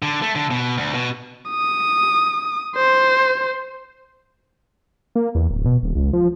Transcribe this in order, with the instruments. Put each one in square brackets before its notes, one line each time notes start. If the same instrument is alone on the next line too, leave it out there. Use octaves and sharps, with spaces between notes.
[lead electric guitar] D3
A3
D3
B2
D2
B2
[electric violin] D#6
C5
[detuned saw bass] A#3
E2
D1
B2
D#1
C#2
F3